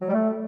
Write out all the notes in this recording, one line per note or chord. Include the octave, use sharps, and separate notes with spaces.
F#3
G3
A3